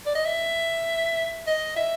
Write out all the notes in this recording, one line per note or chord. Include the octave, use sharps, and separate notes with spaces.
D5
D#5
E5
D#5
E5